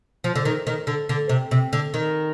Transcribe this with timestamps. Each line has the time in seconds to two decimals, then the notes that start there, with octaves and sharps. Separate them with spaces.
0.24 F3
0.35 D3
0.45 D#3
0.67 D#3
0.87 D3
1.09 D3
1.29 C3
1.51 C3
1.73 D3
1.94 D#3